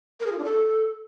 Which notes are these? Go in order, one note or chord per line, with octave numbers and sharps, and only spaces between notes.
A#4
G#4
F4
D4
A4